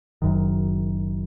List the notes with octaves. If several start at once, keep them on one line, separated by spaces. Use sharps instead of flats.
F#1 F#2 D#3